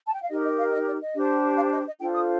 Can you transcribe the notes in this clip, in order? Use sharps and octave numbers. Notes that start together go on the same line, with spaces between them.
A5
G5
F5
D#4 G4 A#4 D#5
D#5
F5
D#5
D5
D#5
D4 G4 C5
F5
D#5
D#5
D4 F4 A4 C5 G5
D#6